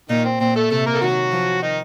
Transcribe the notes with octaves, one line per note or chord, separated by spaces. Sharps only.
A#2 D#3 D#4
C4
A#2 C4
A3 A4
C3 A3 A4
A#3 A#4
A4
D#3 F#3 F#4
F3
D#3 D#4